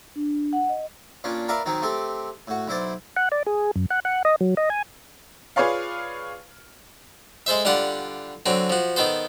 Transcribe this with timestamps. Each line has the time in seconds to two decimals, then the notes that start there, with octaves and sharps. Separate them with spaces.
0.16 D4
0.53 F#5
0.69 D#5
1.24 A#2 C#4 D4
1.48 A#4 B4 D5 E5 F5
1.66 D#3 F#3 C4 D#4
1.82 A3 C4 G4
2.48 A2 F#4
2.68 B1 E4 C5 D5
3.16 F#5
3.32 D5
3.46 G#4
3.76 F#2
3.90 F#5
4.05 F#5
4.25 D#5
4.41 F#3
4.57 D#5
4.70 G#5
5.56 F4 G#4 B4 C#5 D5 F5
7.46 G#3 A4 C5 E5
7.65 D3 G3 F4 F#5
8.46 D3 F#3 C4
8.70 F3 F#4
8.96 D#3 B3 A4 C5